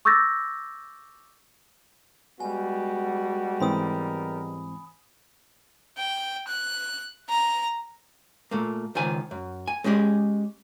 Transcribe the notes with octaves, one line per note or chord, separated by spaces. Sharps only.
C#6 D6 E6 G6 A6 A#6
G3 G#3 B3 F#4 G#5
G#2 E3 C4 A#4 B5 D#6
G5
F#6
A#5
A#2 A3 A#3
C#2 D#3 F3 G#5
F#2
G#5
G#3 C#4 G4 G#4 D5